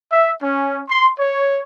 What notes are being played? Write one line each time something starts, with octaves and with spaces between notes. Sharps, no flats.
E5
C#4
C6
C#5